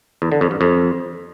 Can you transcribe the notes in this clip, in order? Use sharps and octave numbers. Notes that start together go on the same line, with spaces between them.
E2
D3
F2
G2
F2